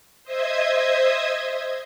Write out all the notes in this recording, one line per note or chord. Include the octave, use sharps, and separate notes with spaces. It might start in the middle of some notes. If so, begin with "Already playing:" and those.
C5 D#5 E5 D#6 G#6